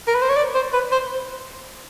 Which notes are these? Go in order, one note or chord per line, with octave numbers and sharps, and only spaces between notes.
A#4
B4
C5
C#5
D5
C5
B4
C5